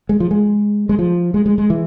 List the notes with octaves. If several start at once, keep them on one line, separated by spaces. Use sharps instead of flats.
G#3
F3
G#3
G#3
F3
G#3
G#3
G#3
E3